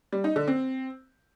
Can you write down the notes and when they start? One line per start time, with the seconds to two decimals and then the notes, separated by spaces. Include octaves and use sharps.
0.12 G3
0.24 D#4
0.36 D3
0.48 C4